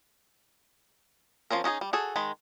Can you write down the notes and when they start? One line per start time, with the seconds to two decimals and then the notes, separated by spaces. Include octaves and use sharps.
1.51 F3 C4 C#4 A#4
1.64 C#4 D#4 F#4 G#4
1.81 G3
1.93 F#4 G#4 A4
2.16 D#3 G#3 B5